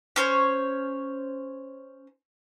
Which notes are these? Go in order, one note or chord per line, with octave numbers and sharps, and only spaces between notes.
C#4 C5 C#5